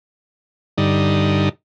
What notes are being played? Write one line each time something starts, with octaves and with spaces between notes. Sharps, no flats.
G2 D3 D#4